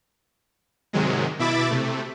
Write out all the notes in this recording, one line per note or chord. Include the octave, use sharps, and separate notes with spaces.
G#2 C3 D#3 F#3 G#3
B2 E4 E5 B5 D6 A6
C3 A3